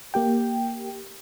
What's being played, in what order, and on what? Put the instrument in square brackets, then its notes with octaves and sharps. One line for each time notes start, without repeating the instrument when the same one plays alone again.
[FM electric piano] A#3 G4 G5